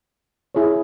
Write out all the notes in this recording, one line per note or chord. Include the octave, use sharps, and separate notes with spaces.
E4 G#4 C#5